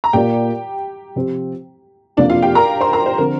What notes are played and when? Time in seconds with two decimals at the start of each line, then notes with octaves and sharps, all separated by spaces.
0.04 A#5
0.13 A#2 A#3 F4 G4 A#4 D5 G5
1.16 C3 F3 C4 G4 C5
2.17 F2 C3 A#3 D4 D5
2.30 F4 F5
2.42 G4 G5
2.55 A#4 A#5
2.81 C5 C6
2.93 A#4 A#5
3.06 C5
3.18 D3 F3 C4 A#4